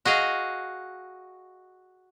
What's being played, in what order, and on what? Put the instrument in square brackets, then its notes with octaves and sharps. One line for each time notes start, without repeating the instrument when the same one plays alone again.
[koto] F#4 G#4 D#5 F5